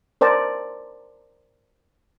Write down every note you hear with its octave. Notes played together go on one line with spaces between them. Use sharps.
A#4 C5 D5 A5 A#5